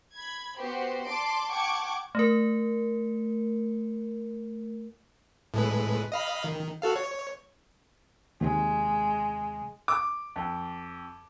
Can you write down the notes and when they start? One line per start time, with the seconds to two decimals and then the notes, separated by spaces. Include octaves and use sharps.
0.15 B5 G#6
0.59 B3 F#4 G4 C5
1.06 D5 A5 C6 D6 D7
1.50 F#5 G5 A5 C#6 D6 G#6
2.15 A3 A#4
5.54 A2 G#3 B4
6.12 D#5 F5 B5
6.44 D#3
6.82 F#4 A4 F5
6.96 C#5
8.41 D#2 C3 G#3
9.88 D6
10.36 F2